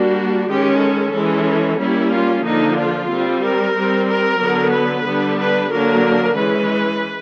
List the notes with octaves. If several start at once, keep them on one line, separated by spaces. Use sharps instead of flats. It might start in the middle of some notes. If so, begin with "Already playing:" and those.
Already playing: G3 A#3 D4 F#4
D#3 G#3 C#4 G4
A4
E3 G#3 C#4
G3 A#3 C#4 E4
F4
D3 F3 A#3 D4 D#4
F4
G3 C4
A#4
G3 C4
A#4
D3 F#3 B3
B4
D3 G3 B3 D4
B4
D3 F#3 A#3 D4 A#4
E3 G#3 C#4 B4